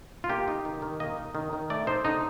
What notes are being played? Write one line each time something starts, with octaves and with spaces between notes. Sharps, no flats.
F4
A#3 G4
D#4
D#3
D#3
A#3 D#5
D#4
D#3
D#3
A3 D5
D#4 C5
D3 D#4